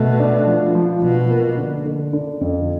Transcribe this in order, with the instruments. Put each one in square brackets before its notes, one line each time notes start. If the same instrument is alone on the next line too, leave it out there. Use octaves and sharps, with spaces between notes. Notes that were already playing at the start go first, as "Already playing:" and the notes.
Already playing: [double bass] B2 [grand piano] A3
[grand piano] D4
F3
F3
[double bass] B2 [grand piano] F3
[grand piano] A#3
D3
D3
D3
F2